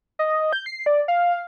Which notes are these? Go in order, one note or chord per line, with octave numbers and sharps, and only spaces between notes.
D#5
G6
C7
D5
F5